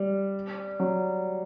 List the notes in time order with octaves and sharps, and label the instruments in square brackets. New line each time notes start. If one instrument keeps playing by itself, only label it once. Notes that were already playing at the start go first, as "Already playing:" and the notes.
Already playing: [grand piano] G3
F#3